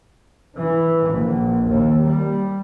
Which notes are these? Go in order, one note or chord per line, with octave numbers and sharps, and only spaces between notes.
E3
A#1
D#2
G3